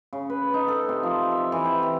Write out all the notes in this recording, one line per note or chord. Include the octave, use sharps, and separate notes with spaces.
C#3
B4
D#4
A4
C3
F3
E5
E3
G5
A#5